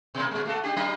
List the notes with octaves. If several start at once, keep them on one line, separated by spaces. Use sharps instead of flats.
B2 A#3
A#2 G#3
A3 F#4 A4
D4 G4
F#3 D4 G4